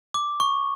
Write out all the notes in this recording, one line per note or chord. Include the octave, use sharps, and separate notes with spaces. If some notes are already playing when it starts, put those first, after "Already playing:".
D6
C#6